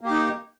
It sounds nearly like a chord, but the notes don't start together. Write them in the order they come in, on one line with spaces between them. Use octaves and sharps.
A#3 G4 D#4